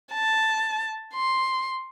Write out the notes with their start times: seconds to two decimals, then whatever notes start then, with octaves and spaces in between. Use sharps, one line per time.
0.13 A5
1.13 C6